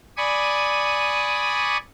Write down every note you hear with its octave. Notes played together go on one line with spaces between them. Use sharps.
D5 G#5 B5 C#6 D#6